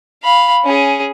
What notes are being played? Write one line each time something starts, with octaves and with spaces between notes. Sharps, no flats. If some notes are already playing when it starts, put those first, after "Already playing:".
F5 B5
C#4 G#4